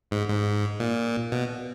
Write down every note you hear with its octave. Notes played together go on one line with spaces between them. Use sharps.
G#2
G#2
A#2
B2